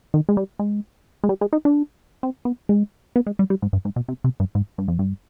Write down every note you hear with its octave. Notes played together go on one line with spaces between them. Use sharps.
D#3
G#3
G3
G#3
G#3
G3
G#3
D#4
D4
C4
B3
G#3
B3
G#3
G3
G3
G#2
G2
G#2
B2
C3
C3
G2
G#2
G2
F2
G2